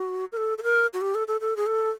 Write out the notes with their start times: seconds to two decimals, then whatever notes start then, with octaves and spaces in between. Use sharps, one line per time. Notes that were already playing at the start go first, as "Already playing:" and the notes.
Already playing: F#4
0.32 A#4
0.37 A4
0.58 A4
0.63 A#4
0.93 F#4
1.01 G4
1.15 A4
1.28 A4
1.41 A4
1.56 G#4
1.66 A4